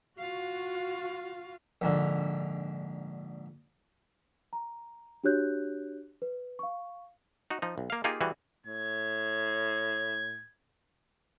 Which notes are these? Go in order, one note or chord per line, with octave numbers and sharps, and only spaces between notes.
F4 F#4 F5
A#1 G#2 D3
A#5
D4 F#4 G4 C#5 F#6 G6
B4
F5 C#6
D#4 F#4
F3 D#4
B1
A#3 F5
A#3 D#4 F4 G4 G#4
E3 G3 F#4 G#4
A2 G#6